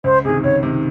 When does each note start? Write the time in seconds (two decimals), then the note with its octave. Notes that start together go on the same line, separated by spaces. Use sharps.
0.04 C#2 C5
0.24 C3 D#3 G#4
0.43 C#2 C#5
0.63 C3 D#3